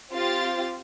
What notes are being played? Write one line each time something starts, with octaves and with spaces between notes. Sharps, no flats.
C4 F4 G4 A6